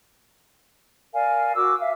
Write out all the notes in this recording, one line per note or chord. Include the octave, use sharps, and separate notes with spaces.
A#4 D5 F5 G#5
F#4 A#4 D6 E6
E5 F5